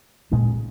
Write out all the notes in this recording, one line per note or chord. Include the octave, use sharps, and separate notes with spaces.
A#2 G#3 C#4